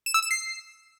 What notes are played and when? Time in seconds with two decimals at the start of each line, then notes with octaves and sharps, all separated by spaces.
0.06 E7
0.14 E6
0.22 E7
0.31 C7